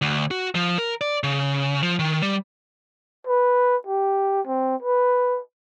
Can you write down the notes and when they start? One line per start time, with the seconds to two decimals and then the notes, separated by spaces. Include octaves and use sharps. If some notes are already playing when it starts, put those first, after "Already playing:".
0.02 D2
0.31 F#4
0.55 F3
0.78 A#4
1.01 D5
1.23 C#3
1.83 F3
1.99 D#3
2.22 G3
3.27 B4
3.87 G4
4.47 C4
4.83 B4